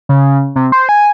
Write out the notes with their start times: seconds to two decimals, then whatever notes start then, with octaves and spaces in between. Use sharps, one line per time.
0.09 C#3
0.56 C3
0.72 C5
0.89 G#5